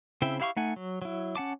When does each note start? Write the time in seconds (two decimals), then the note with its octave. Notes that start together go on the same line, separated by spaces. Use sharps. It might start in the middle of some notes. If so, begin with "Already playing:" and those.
0.22 C#3 C4 E4 E5 G5
0.40 E4 G4 F5 B5 C#6
0.56 A3 D#4 F#5 G#5
0.76 F#3
1.02 F#3 E4
1.35 C#4 F#5 A5 D6